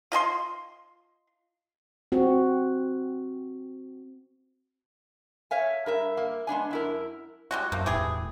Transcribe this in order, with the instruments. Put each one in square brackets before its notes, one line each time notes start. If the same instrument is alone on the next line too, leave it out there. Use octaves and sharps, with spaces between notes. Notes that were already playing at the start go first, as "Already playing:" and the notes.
[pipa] F4 D#5 G#5 C6
[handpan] C4 F#4
[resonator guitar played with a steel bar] C#5 E5 F5 G#5
G2 A#4 E5
A#3
G#3 B3 D4 G#5
F#2 E4 A#4
[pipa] G3 G#3 F#4
[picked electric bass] F#2 [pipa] C3 A3 A#3
[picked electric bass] E1 A2 [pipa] E3 G4 G#4